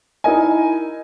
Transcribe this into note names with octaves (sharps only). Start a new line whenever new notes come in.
D#4 E4 A#4 D#5 G#5